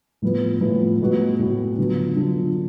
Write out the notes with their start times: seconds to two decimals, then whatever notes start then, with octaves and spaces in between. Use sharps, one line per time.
0.22 A2 F3 B3 F4 B4
0.61 A2 F3 B3 F4 B4
1.00 A2 G#3 B3 F#4
1.39 A2 G#3 B3 F#4
1.78 D3 F#3 B3 F4
2.16 D3 F#3 B3 F4